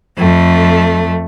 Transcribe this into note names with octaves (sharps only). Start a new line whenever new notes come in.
F2 A3